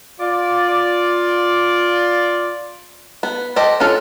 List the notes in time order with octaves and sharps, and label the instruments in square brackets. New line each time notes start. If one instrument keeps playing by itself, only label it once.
[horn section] F4 D5
[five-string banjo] B3
G4 A4 C5 D#5
C#4 D4 F4 A4